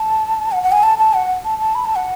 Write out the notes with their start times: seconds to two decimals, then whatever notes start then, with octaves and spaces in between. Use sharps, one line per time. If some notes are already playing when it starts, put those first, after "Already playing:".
Already playing: A5
0.52 F#5
0.63 F#5
0.72 G#5
0.83 A5
0.98 A5
1.14 F#5
1.45 A5
1.59 A5
1.75 B5
1.85 A5
1.96 F#5